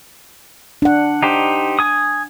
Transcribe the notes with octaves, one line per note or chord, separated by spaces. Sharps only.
D4 F#5
D#4 G4 C5
G#5 D#6